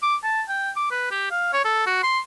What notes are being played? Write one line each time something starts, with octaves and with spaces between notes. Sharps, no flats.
D6
A5
G5
D6
B4
G4
F5
C#5
A4
F#4
C6